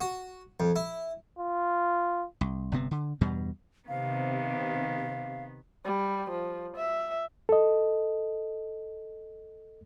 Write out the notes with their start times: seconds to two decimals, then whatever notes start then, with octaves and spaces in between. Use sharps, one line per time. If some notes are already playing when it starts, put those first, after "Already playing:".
0.01 F#4
0.60 F2
0.76 E4
1.39 F4
2.41 C2
2.72 G1 C3 B3 C4
2.91 D3
3.21 E2 G2 B2 G3
3.88 C3 D#3 B3 F5
5.84 G3
6.30 F3
6.76 E5
7.49 A4 D#5